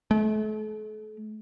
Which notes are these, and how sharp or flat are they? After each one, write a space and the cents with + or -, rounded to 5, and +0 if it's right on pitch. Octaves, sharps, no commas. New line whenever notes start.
A3 -40